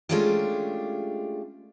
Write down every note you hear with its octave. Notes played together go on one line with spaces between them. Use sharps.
G#3 A3 C#4 D4 F4 G4